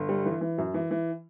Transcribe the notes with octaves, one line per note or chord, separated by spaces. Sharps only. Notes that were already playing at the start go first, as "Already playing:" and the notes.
Already playing: G1
G3
E3
E3
F#2
E3
E3